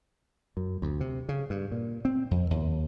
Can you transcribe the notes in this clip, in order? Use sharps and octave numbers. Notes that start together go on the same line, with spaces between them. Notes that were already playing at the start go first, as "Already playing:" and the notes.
F#2
D2
C3
C#3
G2
A#2
C4
F2
D#2